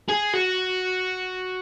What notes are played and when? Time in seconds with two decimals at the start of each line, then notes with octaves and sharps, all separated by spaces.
0.09 G#4
0.33 F#4